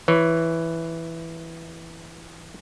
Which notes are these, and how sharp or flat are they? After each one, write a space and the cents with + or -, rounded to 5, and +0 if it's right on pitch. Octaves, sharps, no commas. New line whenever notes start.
E3 +0 C#5 +0